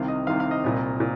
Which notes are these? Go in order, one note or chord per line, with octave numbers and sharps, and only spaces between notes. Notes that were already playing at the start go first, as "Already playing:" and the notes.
Already playing: C2 C3 D#3 F5
D#5
C2 C3 D#3 F5
F5
D#5
C2 A#2
A#2